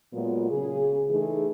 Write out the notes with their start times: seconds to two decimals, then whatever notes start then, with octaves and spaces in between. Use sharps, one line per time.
0.13 A#2 F#3 G#3 B3 F4
0.50 C#3 G#4
1.10 E3 A3 D#4 G#4